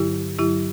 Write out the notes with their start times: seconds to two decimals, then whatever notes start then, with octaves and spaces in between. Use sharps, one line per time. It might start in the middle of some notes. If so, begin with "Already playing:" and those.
Already playing: G2 D3 F#3 E4 G4
0.39 G2 D3 F#3 E4 G4